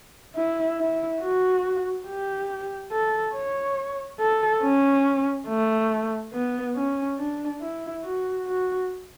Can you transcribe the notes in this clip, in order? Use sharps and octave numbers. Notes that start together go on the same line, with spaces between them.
E4
E4
F#4
G4
A4
C#5
A4
C#4
A3
B3
C#4
D4
E4
F#4
F#4